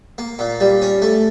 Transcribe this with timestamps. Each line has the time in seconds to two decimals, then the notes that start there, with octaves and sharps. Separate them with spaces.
0.18 A#3
0.39 A#2
0.60 G3
0.82 C#4
1.02 A3